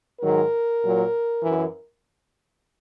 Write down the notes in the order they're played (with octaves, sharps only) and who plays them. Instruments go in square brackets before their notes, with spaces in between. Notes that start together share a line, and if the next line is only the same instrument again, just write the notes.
[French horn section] G#2 D#3 F#3 A#4
A#2 F#3
F#2 E3